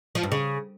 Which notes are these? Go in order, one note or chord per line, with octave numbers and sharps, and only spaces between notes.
F3
G2
C#3